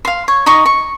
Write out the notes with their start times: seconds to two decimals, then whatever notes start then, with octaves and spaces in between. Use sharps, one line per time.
0.05 F5 C6
0.28 C#5
0.46 D#4 D#5 C#6
0.65 C#6